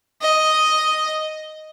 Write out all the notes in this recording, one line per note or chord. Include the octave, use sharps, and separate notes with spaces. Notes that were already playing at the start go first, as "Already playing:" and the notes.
D#5